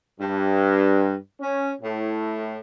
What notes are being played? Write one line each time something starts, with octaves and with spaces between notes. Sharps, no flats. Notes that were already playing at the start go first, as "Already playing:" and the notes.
G2
C#4
A2